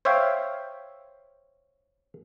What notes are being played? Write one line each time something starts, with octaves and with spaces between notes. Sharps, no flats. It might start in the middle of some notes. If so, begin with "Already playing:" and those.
C5 C#5 E5 F5 G5